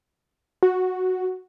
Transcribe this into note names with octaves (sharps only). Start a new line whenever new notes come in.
F#4